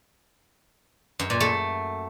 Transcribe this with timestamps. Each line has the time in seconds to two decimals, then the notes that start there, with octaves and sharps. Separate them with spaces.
1.19 F#2
1.30 A#2
1.40 A3